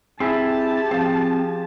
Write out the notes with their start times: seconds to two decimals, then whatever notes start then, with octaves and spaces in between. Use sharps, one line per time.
0.20 C4 E4 G4 G#4 E5 A5
0.91 F3 C4